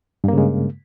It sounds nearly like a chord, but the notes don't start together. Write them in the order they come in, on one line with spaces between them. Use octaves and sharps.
G2 A#3 C#3 G#3